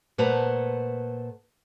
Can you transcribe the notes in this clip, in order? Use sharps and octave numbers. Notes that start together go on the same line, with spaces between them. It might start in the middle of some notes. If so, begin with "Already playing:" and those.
A#2 A3 B4 C5 F#5 A#5